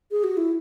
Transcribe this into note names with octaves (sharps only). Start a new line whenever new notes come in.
G#4
F#4
E4